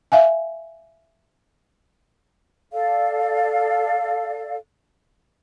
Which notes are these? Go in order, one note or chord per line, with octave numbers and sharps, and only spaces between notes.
E5 F5 G#5
A4 D5 F5